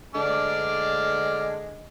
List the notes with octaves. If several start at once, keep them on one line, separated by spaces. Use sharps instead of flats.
D3 G#3 D4 D5 F6